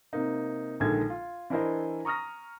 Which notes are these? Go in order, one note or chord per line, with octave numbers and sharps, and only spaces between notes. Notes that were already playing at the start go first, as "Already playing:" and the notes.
C3 A#3 D#4
A#1 D3 D#3 G#3 A4 G#6
F4
E3 D4 E4 A#4 C5 D#5
A#5 C#6 D#6 F6 A#6